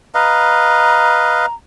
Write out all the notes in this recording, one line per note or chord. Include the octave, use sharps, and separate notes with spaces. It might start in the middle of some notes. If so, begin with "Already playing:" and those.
B4 D#5 F5 A#5